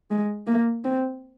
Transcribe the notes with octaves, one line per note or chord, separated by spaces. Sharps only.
G#3
A#3
C4